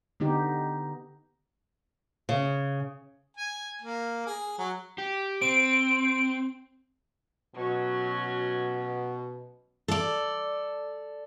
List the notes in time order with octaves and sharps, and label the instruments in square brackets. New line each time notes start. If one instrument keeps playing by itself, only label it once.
[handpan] D3 B3 D#4 G4
[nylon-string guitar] C#3
[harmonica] G#5
A#3
G#4
F#3
[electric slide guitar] G4
[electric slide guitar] C4 [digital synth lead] D7
[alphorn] B2 [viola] F#3 C#4
[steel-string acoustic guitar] A4 D5